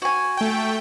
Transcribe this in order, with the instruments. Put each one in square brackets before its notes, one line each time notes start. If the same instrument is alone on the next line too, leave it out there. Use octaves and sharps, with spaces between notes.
[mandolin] F#4 G#5
[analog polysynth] A3 G5